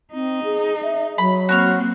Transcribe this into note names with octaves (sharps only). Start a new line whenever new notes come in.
C4 D#4
G#4
E5
F#3 B5
A#3 C4 F#4 C#6 F6